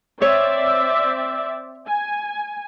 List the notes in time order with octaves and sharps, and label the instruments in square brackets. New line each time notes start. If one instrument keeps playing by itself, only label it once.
[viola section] C4 D5 E5 [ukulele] C#5
[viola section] G#5